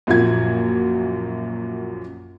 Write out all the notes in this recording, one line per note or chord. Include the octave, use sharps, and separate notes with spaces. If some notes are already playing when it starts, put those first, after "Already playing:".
A#1 F#2 A#2 F3 F#4 G#6